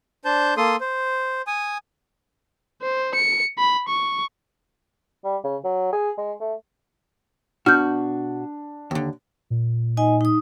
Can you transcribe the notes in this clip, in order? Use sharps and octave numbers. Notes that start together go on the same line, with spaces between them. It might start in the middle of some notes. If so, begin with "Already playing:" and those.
D4 C5 A5 G6
A#3 A4 C6 D#6
C5
G#5 D#6
C5
C#7
B5
C#6
G3
C#3
F#3
G#4
G#3
A3
B2 D4 F#4 F6 G6
D#2 D3
A#2
D#4 D#5 G#5
D#4 D#6